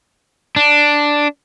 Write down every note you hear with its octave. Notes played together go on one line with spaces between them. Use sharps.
D4